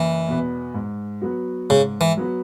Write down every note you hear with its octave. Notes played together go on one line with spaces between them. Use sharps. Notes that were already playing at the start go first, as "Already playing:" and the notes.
Already playing: F#1 E3
E2 B2 B3
G#2
F#3 B3 F#4
G#2 C#3
E3
F#3 B3 F#4